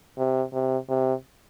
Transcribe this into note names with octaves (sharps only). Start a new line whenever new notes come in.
C3
C3
C3